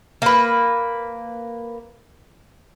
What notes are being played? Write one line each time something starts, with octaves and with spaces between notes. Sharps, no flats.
A#3 B4